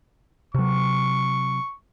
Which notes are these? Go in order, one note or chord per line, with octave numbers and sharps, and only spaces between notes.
C3 F#3 C#6